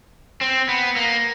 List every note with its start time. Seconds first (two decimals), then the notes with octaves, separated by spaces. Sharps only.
0.41 C4
0.69 B3
0.96 A#3